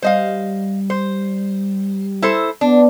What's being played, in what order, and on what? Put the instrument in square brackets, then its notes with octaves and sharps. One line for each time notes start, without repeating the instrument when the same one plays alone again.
[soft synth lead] G3 [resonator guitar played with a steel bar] C5 D#5 F5
[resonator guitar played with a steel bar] C5
E4 A4 C5
[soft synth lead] B3 [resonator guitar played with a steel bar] D4